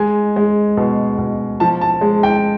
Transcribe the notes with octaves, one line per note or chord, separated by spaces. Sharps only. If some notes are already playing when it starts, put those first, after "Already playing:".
Already playing: G#3 G#5
G#3
B2
B2
F3 A5
A5
G#3
G5